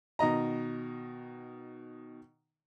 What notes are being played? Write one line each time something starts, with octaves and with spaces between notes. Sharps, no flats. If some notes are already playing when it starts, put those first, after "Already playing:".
B2 D#3 D#5 A#5